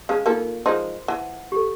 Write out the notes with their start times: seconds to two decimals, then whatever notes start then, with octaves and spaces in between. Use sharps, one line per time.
0.09 C#3 G#3 F5 A5
0.26 A#3 D#4 F4 A4 A#4
0.66 F3 G#3 D#4 C5 A5 C6
1.08 E3 F#5 A5
1.52 G4 A4